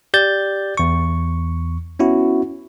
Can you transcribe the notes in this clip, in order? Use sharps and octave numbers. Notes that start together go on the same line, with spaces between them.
G4 D5 G6 A6
E2 C#6
B3 C#4 E4 F#4